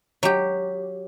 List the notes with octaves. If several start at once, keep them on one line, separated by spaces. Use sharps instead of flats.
F#3 G4